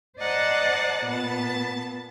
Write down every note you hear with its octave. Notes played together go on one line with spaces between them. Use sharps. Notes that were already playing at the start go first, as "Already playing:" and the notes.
C5 D5 D#5 F#5 A5 A#5
A#2 B3 A5